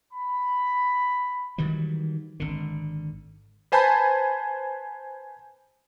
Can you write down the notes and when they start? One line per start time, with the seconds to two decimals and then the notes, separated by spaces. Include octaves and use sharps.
0.12 B5
1.58 D#3 E3 F#3 G3
2.40 G#1 D3
3.72 B4 C5 G#5 A5 B5 G6